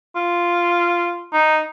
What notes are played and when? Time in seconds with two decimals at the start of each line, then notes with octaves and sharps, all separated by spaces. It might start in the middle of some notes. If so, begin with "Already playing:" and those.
0.16 F4
1.33 D#4